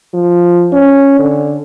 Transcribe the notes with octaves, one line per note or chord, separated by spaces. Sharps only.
F3
C#4
D3